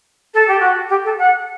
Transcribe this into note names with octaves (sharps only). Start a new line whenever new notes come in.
A4
G4
F#4
G4
A4
F#5